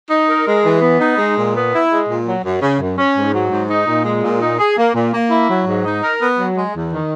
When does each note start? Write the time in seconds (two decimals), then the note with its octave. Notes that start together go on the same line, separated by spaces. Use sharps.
0.10 D#4
0.27 A#4
0.46 G#3
0.64 E3
0.81 B3
0.99 D#4
1.18 G#3
1.36 A#2
1.54 B3
1.71 E4
1.89 G#3
2.07 A#2
2.25 F#3
2.43 F#2
2.60 C#3
2.79 F#2
2.97 C#4
3.15 G#2
3.32 F#3
3.50 G#2
3.69 D#4
3.86 A#2
4.04 G#3
4.22 A#2
4.40 D#4
4.59 G#4
4.76 A#3
4.94 A#2
5.12 A#3
5.30 E4
5.48 F#3
5.66 G#2
5.84 D#4
6.02 A#4
6.20 B3
6.38 F#3
6.56 G#3
6.74 E2
6.91 D#3